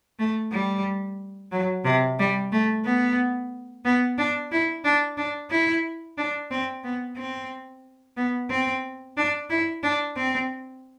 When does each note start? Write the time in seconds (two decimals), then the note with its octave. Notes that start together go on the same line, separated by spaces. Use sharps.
0.19 A3
0.52 G3
1.52 F#3
1.85 C3
2.19 G3
2.52 A3
2.85 B3
3.85 B3
4.18 D4
4.52 E4
4.84 D4
5.17 D4
5.50 E4
6.18 D4
6.51 C4
6.84 B3
7.17 C4
8.17 B3
8.50 C4
9.17 D4
9.50 E4
9.83 D4
10.17 C4